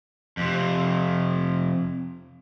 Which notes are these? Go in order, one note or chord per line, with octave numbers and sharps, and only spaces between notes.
F2 C3